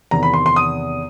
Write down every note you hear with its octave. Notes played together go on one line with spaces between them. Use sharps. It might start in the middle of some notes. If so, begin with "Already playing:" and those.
E2 C3 D#3 A#5
B5
C6
C6
D#6